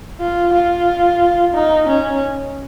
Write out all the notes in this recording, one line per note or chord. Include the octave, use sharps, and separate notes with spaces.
F4
F4
D#4
C#4